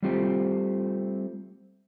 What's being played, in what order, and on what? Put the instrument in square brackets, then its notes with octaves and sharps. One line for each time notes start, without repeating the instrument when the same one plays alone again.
[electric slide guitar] G3 A3 C4 F4 G4